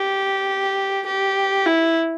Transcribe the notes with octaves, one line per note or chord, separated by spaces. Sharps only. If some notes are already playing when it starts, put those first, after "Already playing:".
Already playing: G4
G4
E4